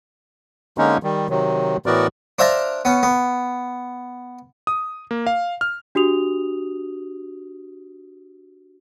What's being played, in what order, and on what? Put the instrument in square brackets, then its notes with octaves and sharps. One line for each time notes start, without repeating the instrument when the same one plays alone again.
[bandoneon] D3 G#3 A#3 C#4 D#4
D#3 G3
C3 D#3 F#3
A2 E3 B3 F#4 A#4 D5
[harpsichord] D4 C5 E5 F5 A5 A#5
B3 C#4
B3
[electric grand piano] D#6
A#3
F5
F6
[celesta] D4 F#4 G4 D#6 F7